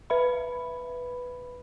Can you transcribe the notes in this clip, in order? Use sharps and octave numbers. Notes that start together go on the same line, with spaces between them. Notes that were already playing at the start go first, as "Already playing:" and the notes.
B4 E5 B5